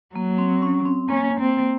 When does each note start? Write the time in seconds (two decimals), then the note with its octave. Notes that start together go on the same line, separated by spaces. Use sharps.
0.15 F#3 A#3
0.38 C4
0.62 C#4
0.85 C4
1.08 A#3 C#4
1.40 C4